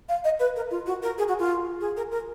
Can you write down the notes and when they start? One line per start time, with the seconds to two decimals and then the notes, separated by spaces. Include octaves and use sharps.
0.09 F5
0.24 D#5
0.39 B4
0.56 A#4
0.71 F4
0.86 F#4
1.03 A#4
1.18 G#4
1.28 F#4
1.39 F4
1.81 G#4
1.97 A#4
2.11 A#4